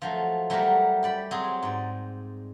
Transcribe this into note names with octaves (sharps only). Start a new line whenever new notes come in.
F3 F#3 A3
F#3 G3 A3 F#4 G4 A#4
G4 D5 B5
F#3 C4 G#4
G#2 D5